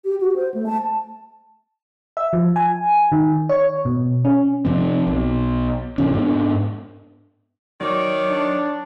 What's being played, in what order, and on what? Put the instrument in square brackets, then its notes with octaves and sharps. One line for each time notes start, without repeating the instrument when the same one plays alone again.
[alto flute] G4
F#4
C5
A3
A5
[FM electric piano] E5
F3
G#5
D#3
C#5
B2
C#4
[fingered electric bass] C3 F3 C4
B1
A2 C3 E3 C#4
G#2 B3 D4
[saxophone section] D#3 C#5 D5 [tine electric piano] F#3
[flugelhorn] D4